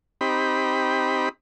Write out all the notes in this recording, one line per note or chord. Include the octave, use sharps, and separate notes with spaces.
C4 D#4 G4 B5